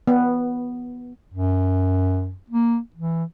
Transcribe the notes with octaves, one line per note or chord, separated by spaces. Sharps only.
B3
F#2
A#3
E3